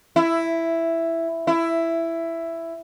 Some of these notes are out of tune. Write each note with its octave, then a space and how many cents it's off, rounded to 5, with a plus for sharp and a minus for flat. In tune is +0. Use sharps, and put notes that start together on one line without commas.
E4 +5
E4 +10